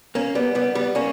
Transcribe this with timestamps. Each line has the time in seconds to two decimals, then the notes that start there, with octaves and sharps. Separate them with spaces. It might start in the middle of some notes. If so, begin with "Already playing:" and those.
0.15 A#3 C#4
0.35 G3 B3
0.55 G3 B3
0.75 G3 B3
0.95 A#3 C#4